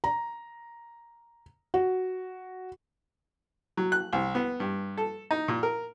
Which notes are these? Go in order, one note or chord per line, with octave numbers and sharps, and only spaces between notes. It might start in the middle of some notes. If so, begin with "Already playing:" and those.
A#5
F#4
F#3
F#6
C2
B3
G2
A4
D#4
A#2
A#4